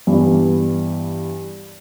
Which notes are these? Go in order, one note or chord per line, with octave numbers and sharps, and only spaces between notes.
G2 E3 B3